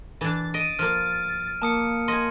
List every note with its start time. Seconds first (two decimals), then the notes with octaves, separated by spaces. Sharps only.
0.21 E3 D4 A6
0.54 D#5 D7 D#7
0.79 F3 A#3 F6
1.62 A#3 A5 D#6 C#7
2.08 D#5 G#5 C6 A#6